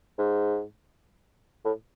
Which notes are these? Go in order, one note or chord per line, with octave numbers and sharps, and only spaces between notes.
G#2
A2